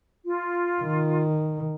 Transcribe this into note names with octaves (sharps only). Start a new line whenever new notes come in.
F4
D#3